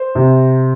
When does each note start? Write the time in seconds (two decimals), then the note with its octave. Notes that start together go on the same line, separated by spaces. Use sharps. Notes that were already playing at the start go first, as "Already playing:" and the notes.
Already playing: C5
0.15 C3